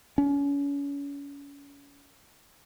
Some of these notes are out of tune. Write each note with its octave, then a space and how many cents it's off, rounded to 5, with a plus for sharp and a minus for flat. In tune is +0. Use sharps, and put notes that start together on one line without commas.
C#4 +35